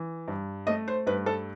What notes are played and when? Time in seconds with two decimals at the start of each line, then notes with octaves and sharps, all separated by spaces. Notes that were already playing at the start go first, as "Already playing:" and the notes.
Already playing: E3
0.28 G2
0.67 A3 D#5
0.88 C5
1.07 G2 B4
1.26 A4